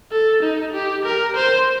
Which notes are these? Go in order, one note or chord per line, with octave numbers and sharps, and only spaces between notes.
A4
D#4
G4
A#4
C5